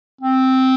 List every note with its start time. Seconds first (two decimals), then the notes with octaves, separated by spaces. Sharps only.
0.21 C4